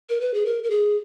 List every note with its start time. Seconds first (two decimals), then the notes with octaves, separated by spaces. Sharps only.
0.09 A#4
0.21 B4
0.34 G#4
0.46 A#4
0.64 A#4
0.70 G#4